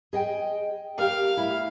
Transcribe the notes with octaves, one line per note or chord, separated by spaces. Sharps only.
G#4 D#5 G5
G4 A#4 F5
A3 E4